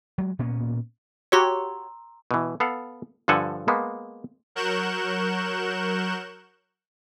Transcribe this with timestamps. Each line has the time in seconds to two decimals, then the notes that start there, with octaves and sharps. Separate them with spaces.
0.18 F#3 G#3
0.39 A#2 A#3 B3 C#4
1.32 F#4 G4 C#5 A#5 C6 E6
2.31 B2 E3
2.60 B3 A4 F5 F#5
3.28 G2 D3 F3 A4 F#5 G#5
3.68 G#3 A#3 B3
4.55 F#3 A#4 C#6 F#6 G6 E7